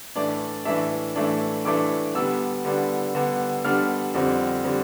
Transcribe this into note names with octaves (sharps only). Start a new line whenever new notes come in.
A2 E3 A3 D4 D5
A2 E3 A3 D4 E5
A2 E3 A3 D4
A2 E3 A3 D4 D6
D3 G3 B3 D4 E6
D3 G3 B3 D4
D3 G3 B3 D4
D3 G3 B3 D4 F6
F2 D3 G3 C4
D3 G3 C4